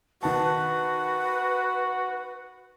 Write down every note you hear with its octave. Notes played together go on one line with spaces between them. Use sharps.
D#3 F#4 B4 A5